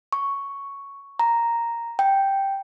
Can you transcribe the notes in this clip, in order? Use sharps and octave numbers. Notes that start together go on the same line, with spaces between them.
C#6
A#5
G5